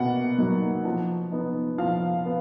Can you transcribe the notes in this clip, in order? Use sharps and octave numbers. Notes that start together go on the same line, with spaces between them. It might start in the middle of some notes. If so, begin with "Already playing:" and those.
Already playing: B2 A#3 F#5
F#3 A#3 D#4
F3
B3 D#4
F3 F5
B3